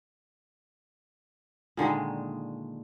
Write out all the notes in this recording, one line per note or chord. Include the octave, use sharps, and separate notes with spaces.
A#2 D3 D#3 G#3